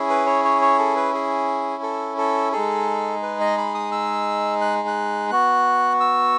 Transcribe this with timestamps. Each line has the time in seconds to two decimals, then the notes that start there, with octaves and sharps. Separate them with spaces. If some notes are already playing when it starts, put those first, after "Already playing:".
Already playing: C#4 E4 G#4
0.10 B4
0.26 C#5
0.44 C#5
0.62 C#5
0.79 A4
0.96 B4
1.14 G#4
1.83 A4
2.18 A4
2.52 G#3 D#4 G#4 A4
3.22 B4
3.40 D#5
3.58 B5
3.75 D#6
3.92 E6
4.61 F#6
4.88 F#6
5.31 B3 F#4 F#6
6.00 E6